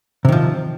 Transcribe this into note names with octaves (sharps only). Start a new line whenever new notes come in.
C3 D#3 F3